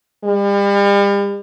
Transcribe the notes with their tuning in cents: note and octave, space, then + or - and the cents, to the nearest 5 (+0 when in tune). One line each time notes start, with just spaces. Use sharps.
G3 +40